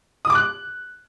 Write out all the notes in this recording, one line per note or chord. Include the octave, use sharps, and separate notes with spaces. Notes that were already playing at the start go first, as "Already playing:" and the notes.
D#6
D6
F#6